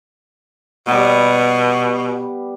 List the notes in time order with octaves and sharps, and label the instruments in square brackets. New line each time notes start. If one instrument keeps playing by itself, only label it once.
[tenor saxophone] B2 [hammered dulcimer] G3 B3